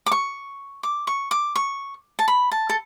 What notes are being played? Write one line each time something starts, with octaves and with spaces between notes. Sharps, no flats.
D6
C#6
D6
C#6
D6
C#6
A5
B5
A5
A4